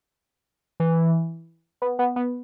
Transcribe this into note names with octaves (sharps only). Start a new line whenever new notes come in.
E3
B3
B3
B3